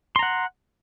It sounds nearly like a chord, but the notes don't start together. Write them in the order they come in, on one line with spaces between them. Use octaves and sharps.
C6 A#5 F#5